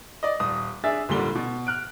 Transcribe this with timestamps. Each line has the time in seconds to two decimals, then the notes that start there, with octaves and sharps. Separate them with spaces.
0.23 D5 D#5
0.40 D#1 D#6
0.84 D4 G#4 E5 A6
1.09 G#1 A#2 D3 G3 G7
1.35 B2
1.67 F6 F#6 D7